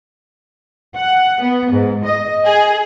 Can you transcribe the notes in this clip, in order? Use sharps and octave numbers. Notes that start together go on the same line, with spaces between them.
F#5
B3
G#2
D#5
G#4